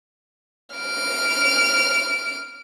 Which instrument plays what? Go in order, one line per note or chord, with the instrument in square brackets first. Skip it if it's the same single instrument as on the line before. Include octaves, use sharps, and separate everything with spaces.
[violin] F6 D7